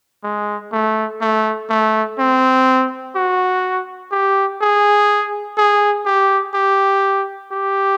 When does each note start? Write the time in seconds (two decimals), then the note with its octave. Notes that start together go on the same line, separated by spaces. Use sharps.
0.24 G#3
0.72 A3
1.21 A3
1.69 A3
2.19 C4
3.15 F#4
4.12 G4
4.61 G#4
5.58 G#4
6.06 G4
6.54 G4
7.52 G4